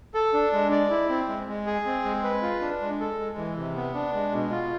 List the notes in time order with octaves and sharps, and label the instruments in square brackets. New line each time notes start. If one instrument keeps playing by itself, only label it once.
[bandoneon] A4
D4
G#3
D5
E4
C4
G#3
G#3
G#4
C4
G#3
B4
F4
D4
G#3
A4
G#3
E3
C3
B3
D4
G#3
B2
F4